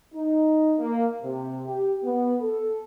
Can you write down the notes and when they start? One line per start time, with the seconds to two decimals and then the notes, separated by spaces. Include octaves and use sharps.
0.13 D#4
0.79 A#3
1.22 C3
1.66 G4
2.03 B3
2.41 A4